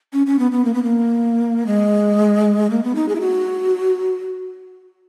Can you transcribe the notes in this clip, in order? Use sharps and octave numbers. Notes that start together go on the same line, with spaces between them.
C#4
C#4
B3
B3
A#3
B3
A#3
G#3
A#3
B3
D#4
G#4
E4
F#4